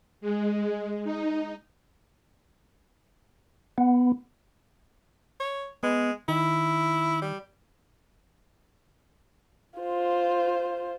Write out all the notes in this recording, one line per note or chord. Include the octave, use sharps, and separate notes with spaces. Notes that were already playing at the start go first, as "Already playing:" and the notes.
G#3
D#4
B3
C#5
G#3 B3
D#3 E4
G3
F4 C5